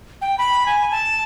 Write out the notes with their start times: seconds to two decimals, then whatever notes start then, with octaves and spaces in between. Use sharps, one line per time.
0.22 G5
0.38 B5
0.66 G#5
0.91 A5